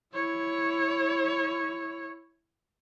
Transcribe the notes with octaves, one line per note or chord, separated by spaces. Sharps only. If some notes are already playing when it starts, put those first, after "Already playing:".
E4 C#5